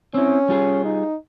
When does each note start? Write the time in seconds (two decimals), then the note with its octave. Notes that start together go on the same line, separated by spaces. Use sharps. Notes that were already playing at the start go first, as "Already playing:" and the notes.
0.14 C4 C#4 E4
0.49 G3 F4 G#4
0.85 D#4